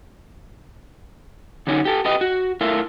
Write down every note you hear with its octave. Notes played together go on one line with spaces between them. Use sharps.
D3 F#3 C#4 D#4
G4 A4
G4 B4 D#5
F#4
A3 E4 F4 A#4